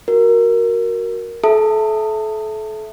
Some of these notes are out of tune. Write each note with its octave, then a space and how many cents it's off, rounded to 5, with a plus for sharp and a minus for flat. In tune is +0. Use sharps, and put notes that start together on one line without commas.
F#4 +0 A#4 +0
A4 -30 E5 +0 A5 +35